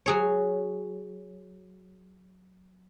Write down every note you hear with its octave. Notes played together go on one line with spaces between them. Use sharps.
F#3 G#4 C#5